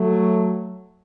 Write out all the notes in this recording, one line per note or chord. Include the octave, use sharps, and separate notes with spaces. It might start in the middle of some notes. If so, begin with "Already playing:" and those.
Already playing: F#3 A3